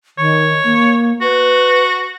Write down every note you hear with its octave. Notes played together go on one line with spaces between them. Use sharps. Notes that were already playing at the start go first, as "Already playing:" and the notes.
D#3 C#5
A#3
F#4 B4